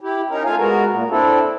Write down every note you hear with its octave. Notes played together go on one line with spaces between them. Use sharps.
E4 G4
C#4 D#4 A#4
A3 F4 F5 G#5
G#3 B3 F#4 A#4
A#2
C4 D4 E4 A4